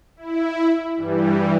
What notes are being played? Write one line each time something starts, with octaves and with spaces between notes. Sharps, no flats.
E4
G2 E3 G3